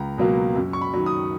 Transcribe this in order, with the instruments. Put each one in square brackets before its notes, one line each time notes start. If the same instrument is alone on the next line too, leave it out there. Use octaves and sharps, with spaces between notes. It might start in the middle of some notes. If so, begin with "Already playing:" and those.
Already playing: [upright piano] C#2 A#5
B2 F#3 A#3
F#2
C#6
B5
D#3 F#3
D#6